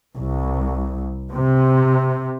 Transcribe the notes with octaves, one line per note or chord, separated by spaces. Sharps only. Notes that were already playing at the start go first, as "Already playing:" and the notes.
C2
C3